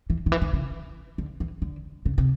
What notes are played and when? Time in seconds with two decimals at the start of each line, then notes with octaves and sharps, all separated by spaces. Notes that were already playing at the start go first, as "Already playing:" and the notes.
0.10 E3
0.26 D#3
0.32 E3
0.42 D#3
0.53 C#3
1.18 D3
1.40 E3
1.62 D3
2.06 C#3
2.18 C3